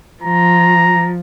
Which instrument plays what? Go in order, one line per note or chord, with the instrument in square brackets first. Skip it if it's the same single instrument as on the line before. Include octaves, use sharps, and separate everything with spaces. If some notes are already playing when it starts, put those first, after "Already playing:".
[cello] F3 [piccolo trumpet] A#5